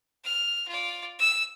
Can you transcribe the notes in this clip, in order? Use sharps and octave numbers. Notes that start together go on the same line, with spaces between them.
F6
F4 D5
E6